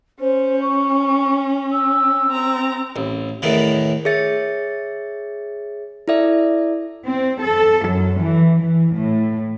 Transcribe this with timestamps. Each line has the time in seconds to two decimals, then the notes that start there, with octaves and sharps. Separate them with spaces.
0.20 C#4 C5
0.61 C#6
1.72 E6
2.29 C4 A#5
2.96 A1
3.42 E2 A2 D#3 E3
4.05 G#4 C#5 E5 A6 C#7
6.08 E4 A4 D5 E5
7.04 C4
7.43 A4
7.87 F#2
8.21 E3
8.61 E3
8.95 A2